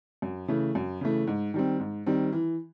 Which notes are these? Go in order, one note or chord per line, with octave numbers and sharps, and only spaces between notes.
F#2
C#3 E3 A3
F#2
C#3 E3 A3
G#2
D#3 G3 C4
G#2
D#3 G3 C4
E3